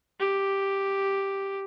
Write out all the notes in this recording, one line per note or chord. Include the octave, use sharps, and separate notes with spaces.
G4